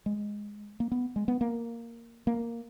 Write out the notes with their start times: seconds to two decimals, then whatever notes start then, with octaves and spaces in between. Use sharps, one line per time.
0.06 G#3
0.80 A#3
0.92 B3
1.16 G#3
1.28 B3
1.41 A#3
2.27 A#3